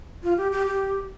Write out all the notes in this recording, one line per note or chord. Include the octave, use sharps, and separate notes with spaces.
F4
G4
G4
G4